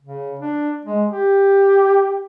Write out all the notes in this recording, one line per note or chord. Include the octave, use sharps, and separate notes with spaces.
C#3
D4
G#3
G4